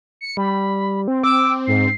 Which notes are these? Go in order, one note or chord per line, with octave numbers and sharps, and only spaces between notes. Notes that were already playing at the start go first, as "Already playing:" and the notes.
C#7
G3 B5
C4
C4 D6 E6
G#2 C7